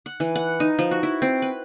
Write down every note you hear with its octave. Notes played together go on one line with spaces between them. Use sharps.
F#5
E3
F#5
D#4
F3
F#4
E4
C4
B4